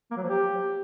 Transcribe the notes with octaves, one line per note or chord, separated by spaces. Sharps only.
A#3
F#3
F3
G4